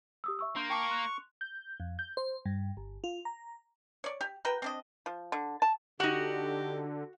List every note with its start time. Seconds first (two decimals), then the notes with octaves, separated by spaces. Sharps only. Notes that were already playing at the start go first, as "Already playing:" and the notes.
0.24 G4 D#6 E6
0.39 E5 C#6 E6
0.56 A#3 D4 C6 G6
0.70 G5 A5 C#6 D6
0.89 C6 F#6 F7
1.41 G6
1.80 F2
1.99 G6
2.17 C5
2.46 G2
2.77 G1
3.04 F4
3.25 A#5
4.04 C#5 D5
4.21 G4
4.45 F#4 A#4 B4 G5
4.62 C4 D4 D#5
5.06 F3
5.32 D3
5.62 A5
6.00 D3 D#4 F#4 G4 F#5